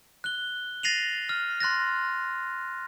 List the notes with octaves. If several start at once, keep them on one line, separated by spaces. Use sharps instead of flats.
F#6 G7
A6 A#6 C7 D#7 F7 F#7
F6
C6 F#6 A6 A#6